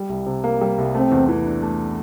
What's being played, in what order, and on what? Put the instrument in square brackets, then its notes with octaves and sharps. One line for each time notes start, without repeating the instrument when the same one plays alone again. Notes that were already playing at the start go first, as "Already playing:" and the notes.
Already playing: [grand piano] G3
C2
C3
A#3
G3
C2
[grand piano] A3 [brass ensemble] C4
[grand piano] E2
E3
D4
A3